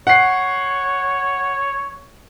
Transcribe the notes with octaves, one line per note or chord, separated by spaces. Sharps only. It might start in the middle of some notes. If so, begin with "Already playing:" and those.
C#5 F#5 C7